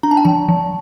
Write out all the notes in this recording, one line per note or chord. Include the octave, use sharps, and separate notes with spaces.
D4 A#5
A5
G5
F3 A5
F3